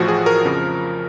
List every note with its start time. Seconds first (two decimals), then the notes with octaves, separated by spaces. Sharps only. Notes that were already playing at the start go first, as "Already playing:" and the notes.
Already playing: A1 A2 F3 F#4
0.08 G#4
0.26 A#4
0.45 F2 C#3 F3